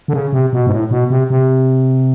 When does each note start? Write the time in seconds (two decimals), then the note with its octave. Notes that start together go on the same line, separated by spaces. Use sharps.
0.08 D3
0.13 C#3
0.33 C3
0.53 B2
0.67 G#2
0.72 A2
0.91 B2
1.10 C3
1.30 C3